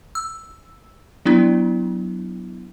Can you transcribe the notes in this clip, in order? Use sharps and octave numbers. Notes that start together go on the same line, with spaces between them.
E6
F#3 B3 D4 E4